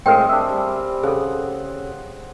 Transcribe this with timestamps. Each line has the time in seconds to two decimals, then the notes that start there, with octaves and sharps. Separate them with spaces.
0.06 A2 G#3 C4 G#4 A#4 F5 G5
0.29 D4 E5
0.49 G3
1.03 C#3 G#4 A4 F#5